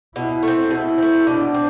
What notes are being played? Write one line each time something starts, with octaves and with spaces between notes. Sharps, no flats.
B2 E4
A3 C4
B2 E4
A3 C4
B2 D4
C4